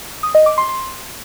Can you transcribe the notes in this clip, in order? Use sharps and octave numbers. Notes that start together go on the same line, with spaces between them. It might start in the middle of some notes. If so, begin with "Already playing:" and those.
D#6
D#5
D6
C6
C6